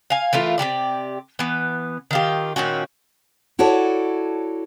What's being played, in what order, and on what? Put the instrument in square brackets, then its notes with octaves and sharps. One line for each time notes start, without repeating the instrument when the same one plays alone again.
[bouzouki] F5 G#5
E3 A3 F4 A#4
C3 G3 G4 D5
E3 B3
D#3 F4 G4
A#2 D#3 C#4 F#4
[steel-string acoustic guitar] E4 F#4 A4 C#5 D5